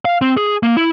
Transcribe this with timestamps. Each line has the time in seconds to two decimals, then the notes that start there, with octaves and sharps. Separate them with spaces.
0.05 F5
0.22 C4
0.37 G#4
0.63 A#3
0.77 E4